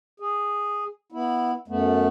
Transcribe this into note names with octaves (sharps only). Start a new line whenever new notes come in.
G#4
B3 E4
F#2 A3 B3